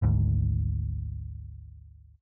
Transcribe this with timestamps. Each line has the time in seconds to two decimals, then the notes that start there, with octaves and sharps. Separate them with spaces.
0.02 G#1 D2 G#2